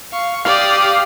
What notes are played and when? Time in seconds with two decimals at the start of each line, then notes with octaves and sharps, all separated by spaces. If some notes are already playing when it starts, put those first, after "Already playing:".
0.12 F5 C#6
0.45 G4 D5 F5 D#6